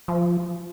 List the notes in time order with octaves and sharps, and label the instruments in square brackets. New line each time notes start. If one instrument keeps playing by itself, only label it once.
[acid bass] F3